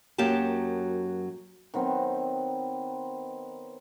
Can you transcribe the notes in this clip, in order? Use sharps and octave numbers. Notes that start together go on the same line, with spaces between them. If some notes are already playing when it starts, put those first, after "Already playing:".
F#2 F#3 A#3 G4 A5
D#3 F#3 B3 C4